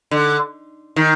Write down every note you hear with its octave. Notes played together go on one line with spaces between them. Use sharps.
D3
D#3